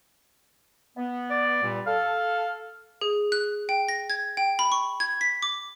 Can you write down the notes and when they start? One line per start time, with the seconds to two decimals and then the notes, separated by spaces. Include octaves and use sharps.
0.97 B3
1.30 D5
1.62 G2 A#2 G3
1.87 A4 F5
3.01 G#4
3.32 F#6
3.69 G5
3.89 A#6
4.10 G#6
4.37 G5
4.59 B5
4.72 C#6
5.00 G#6
5.21 B6
5.42 D6